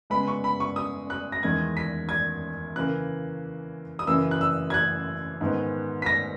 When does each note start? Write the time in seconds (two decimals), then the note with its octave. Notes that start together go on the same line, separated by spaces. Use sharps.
0.10 C#3 G#3 B3 B5
0.28 C#6
0.44 B5
0.60 C#6
0.76 D#6
1.10 F#6
1.32 A#6
1.43 E2 D#3 G#3 G#6
1.77 B6
2.09 G#6
2.76 C#3 E3 A#3 F#6
3.99 D#6
4.07 F#2 C#3 E3 A#3 E6
4.31 F#6
4.41 E6
4.70 G#6
4.74 F#6
5.41 G#2 D#3 G#3 B3
6.02 B6
6.06 A#6